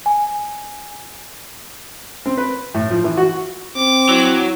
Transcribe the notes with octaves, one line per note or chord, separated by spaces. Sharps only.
G#5
C4
B4
A2
F3
E3
F#4
C4 D6
F#3 E4